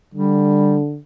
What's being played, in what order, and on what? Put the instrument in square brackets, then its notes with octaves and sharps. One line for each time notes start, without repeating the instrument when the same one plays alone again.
[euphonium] D3 [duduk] G3